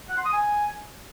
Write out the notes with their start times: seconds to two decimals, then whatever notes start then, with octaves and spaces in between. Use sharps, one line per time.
0.09 F#5
0.17 C6
0.25 D#6
0.33 G#5